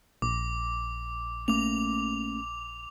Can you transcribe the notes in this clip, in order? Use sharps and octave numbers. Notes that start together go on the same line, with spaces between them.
A#1 D6
A3 A#3 C#4 D6 F7